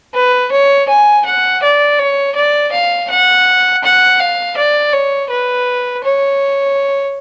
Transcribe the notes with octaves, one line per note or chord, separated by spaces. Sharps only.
B4
C#5
G#5
F#5
D5
C#5
D5
F5
F#5
F#5
F5
D5
C#5
B4
C#5